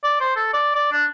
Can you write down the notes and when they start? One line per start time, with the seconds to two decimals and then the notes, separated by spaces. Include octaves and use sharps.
0.04 D5
0.21 C5
0.36 A4
0.54 D5
0.75 D5
0.92 D4